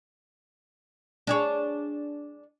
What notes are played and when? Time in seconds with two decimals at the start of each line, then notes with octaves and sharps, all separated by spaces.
1.27 D4 G#4 C#5